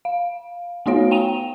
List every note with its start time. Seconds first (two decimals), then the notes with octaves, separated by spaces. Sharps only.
0.05 F5
0.86 A3 B3 D#4 F#4 C#5 F5
1.11 G5 A#5 D#7 F7